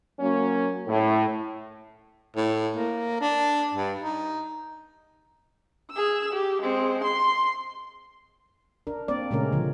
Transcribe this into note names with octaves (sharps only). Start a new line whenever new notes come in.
F#3 A#3 C#4
A2
A2
A#3
D4
G2
D#4
G#4 E6
G4
G#3 C4
C6
D4 A#4
A#3 C4 D5
A#2 C#3 G#3 A3 C#4 A#4
D3 F3